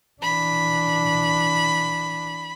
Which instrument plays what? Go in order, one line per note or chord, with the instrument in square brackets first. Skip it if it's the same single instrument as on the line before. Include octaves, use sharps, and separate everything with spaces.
[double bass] E3 D4 [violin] B5